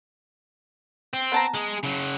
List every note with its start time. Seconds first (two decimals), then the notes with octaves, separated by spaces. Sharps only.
1.13 C4
1.32 B3 A5 A#5
1.54 G#3 G#4
1.83 C#3 F#3